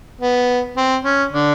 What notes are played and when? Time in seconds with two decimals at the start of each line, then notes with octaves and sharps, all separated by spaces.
0.21 B3
0.77 C4
1.04 C#4
1.32 D3 D4